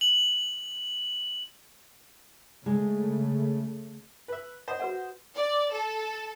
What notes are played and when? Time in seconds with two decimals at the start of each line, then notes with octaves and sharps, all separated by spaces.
0.01 F#7
2.66 C#3 G#3 A3
4.28 B4 E5
4.68 C5 D#5 F#5
4.80 F#4 B4 F#5
5.35 D5
5.72 A4